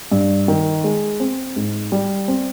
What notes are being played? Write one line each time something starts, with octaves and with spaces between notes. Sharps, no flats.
G2
D#3
G#3
C4
G#2
G3
C4